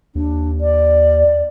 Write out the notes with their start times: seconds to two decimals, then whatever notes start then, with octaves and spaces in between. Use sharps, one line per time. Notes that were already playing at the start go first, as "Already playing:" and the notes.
0.15 D#2 D4
0.61 D5